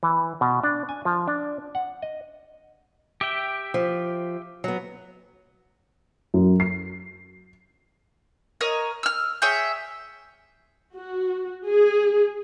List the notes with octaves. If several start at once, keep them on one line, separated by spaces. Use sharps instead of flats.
E3
B2
D4
G#5
F3
D4
F#5
D#5
G4 E5 G5
F3
F#3 B3
F#2
C7
A#4 C#5 D#5
E6 F6
G#4 C#5 E5 G5
F#4
G#4